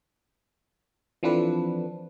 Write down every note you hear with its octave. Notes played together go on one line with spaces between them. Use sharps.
E3 F3 C4 D4 A4 B4